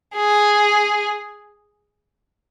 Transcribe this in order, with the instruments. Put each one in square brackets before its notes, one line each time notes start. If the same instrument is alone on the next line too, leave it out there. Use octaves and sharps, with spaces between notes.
[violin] G#4